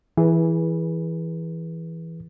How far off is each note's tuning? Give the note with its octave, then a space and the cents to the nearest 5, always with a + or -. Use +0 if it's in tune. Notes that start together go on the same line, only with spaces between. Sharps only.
E3 +0 G#4 +0 B4 -20